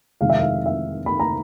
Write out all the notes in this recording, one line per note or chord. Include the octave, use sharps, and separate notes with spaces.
F2 C3 D#3 G#3 F5
E5
F5
E5
B5
A#5